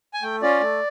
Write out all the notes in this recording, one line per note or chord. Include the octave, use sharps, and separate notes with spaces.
G#5
A3 G5
C#4 F4 D5
A3